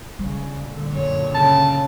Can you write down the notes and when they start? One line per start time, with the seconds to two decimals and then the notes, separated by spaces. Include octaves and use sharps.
0.19 C#3 G3
0.64 A#2 D3
0.93 F#2 C#5
1.35 C#3 A5